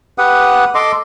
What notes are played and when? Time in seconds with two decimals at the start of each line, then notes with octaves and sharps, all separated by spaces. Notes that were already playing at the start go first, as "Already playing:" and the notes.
0.18 G4 B4 F#5 D#6
0.75 A4 D#5 C6 D6